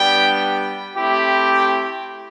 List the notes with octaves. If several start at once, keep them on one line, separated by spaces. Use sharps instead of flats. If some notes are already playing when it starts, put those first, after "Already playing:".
Already playing: G3 B3 D4 G4 G5
A3 C4 E4 G4
G5